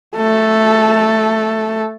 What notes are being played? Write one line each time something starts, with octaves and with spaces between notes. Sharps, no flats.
A3 A4